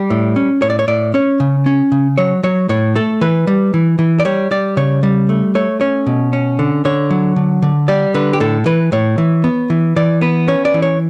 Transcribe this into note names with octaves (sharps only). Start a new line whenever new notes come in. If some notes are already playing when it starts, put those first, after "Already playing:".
Already playing: G3 D5
A2
C#4
A2 C#5
D5
C#5
A2 D5
C#4 C#5
C#3
C#4
C#3
F#3 C#5
F#3 C#5
A2 C#5
A3 A4
E3 B4
G3
E3
E3
D5
G3 C#5
G3 D5
C#3 C#5
G3
A3
A3 C#5
C#4 C#5
B2
C#4
D3
D3 C#5
F#3
D3
D3
G3 D5
D3 B4
G4
A2 A4
E3 B4
A2 C#5
E3
B3
E3
E3 D5
B3 B4
C#4 C#5
D5
E3
C#5